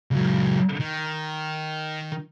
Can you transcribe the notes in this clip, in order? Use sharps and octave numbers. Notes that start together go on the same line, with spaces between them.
C#2 F#3
D#3